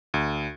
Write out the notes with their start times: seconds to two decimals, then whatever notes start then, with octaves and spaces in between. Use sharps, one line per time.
0.14 D2